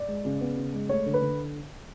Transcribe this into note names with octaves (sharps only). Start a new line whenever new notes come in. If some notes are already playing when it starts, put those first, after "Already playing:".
Already playing: D5
G#3
C#3
B3
C#3
G#3
A3 C#5
D3
B4
D3